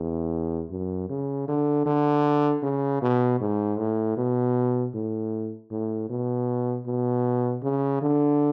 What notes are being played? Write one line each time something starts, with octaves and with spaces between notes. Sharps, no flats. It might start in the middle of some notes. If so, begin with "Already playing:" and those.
Already playing: E2
F#2
C#3
D3
D3
C#3
B2
G#2
A2
B2
A2
A2
B2
B2
C#3
D3